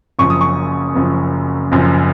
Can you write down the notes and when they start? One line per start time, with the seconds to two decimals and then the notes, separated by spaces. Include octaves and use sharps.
0.19 F#1 F#2 F3 C#6
0.30 D#6
0.41 C#6
0.96 F#1 F#2 F3
1.72 F#1 F#2 F3